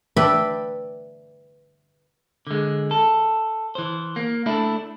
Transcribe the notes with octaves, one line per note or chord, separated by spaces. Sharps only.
B4 D5 E5 G5 A5 B5
D3 G#3
A4
E3 C5
A#3
A3 D4 E4